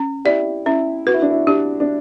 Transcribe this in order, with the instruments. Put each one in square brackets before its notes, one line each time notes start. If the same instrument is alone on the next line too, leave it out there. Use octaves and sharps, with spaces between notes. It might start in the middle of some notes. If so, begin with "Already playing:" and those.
Already playing: [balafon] C#4
[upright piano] E4 G4 [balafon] D5
[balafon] C#4 [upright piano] E4
[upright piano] F#4 [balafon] B4
[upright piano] E4
D4
E4
[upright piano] D4 [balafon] G4
[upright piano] D4